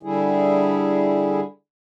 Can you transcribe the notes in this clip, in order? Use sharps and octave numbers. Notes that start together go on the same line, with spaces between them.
D3 G3 E4 G#4